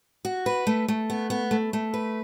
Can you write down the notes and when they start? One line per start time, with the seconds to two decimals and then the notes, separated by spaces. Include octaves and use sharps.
0.25 F#4
0.46 B4
0.67 A3
0.88 A3
1.10 B3
1.30 B3
1.51 A3
1.73 A3
1.94 B4